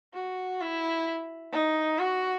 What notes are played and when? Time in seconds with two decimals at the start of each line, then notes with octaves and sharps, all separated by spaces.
0.14 F#4
0.61 E4
1.52 D#4
1.99 F#4